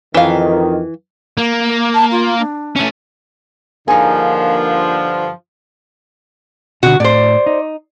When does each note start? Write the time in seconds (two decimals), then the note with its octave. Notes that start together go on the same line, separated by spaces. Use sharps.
0.14 F2 D#3 E3 F5
1.38 A#3
1.94 A5
2.11 F4
2.39 D4
2.76 A3 C#4
3.88 G2 D3 F3 A#3 D#4 G#4
6.83 B2 D3 F#4
7.00 A2 C5 D5
7.46 D#4